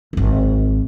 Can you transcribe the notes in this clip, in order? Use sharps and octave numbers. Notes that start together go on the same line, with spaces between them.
D#1 G#1